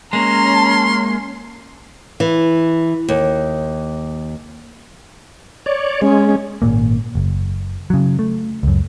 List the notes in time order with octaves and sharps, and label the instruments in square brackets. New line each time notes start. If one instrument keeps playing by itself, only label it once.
[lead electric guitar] G#3 A#3 [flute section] C#4 [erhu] A#5 [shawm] C6
[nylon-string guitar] E3
D#2
[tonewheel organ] C#5 D5
[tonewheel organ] G#3 [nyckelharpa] C#4
[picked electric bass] G#1 A#2 A#3
F#1
C#3 F#3
A3
C#2 F#2